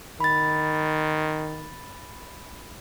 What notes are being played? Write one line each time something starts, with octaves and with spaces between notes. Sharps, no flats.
D#3 B5 A6